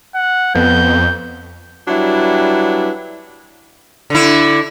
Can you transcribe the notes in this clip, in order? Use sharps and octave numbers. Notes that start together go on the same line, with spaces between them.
F#5
F2 B3 G6
F#3 G3 D4 E4 B4
D3 E4